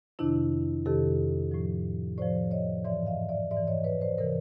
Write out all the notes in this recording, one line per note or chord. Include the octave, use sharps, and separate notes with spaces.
F2 C3 D#3 D4 E4
F2 C3 D#3 G4 A4
A2 F3
A2 F3 C5 D5
C#5 D#5
G#2 E3 D5 E5
D#5 F5
D5 E5
G#2 D5 E5
E3
C#5 D#5
B4 C#5
C5 D5
C3 E3 A#4 C5